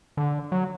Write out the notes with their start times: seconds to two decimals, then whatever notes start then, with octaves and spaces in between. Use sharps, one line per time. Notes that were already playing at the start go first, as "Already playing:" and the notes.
0.17 D3
0.52 F#3